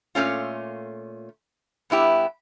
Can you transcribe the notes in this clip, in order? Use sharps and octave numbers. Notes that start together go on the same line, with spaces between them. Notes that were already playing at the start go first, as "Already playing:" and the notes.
A#2 A3 C#4 F4
G2 B3 E4 G4